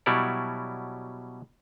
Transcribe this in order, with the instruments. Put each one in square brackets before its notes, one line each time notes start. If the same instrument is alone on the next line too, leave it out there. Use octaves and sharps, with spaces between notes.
[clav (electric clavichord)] B2 F#3 G3 E4 C#5 D5